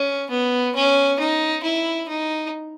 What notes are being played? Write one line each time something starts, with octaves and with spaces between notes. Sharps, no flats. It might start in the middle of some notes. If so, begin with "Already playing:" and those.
Already playing: C#4
B3
C#4
D#4
E4
D#4